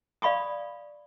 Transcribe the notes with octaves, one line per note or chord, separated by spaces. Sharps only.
D5 F5 B5 C#6 D#6